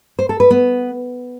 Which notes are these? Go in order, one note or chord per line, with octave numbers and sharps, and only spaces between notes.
C5
A4
B4
B3